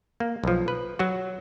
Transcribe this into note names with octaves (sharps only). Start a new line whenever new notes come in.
A#3
B1 F3
B4
F#3 F#4